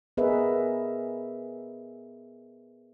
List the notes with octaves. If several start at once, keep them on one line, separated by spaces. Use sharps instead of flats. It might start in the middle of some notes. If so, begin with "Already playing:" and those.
B3 G#4 A#4 B4 D#5 E5